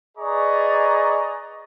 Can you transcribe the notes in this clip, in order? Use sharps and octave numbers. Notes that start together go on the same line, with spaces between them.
G#4 B4 D5 D#5 A#5 C#6